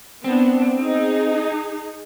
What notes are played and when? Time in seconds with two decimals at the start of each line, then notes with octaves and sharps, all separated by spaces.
0.24 B3 C4 D4
0.77 D#4 G#4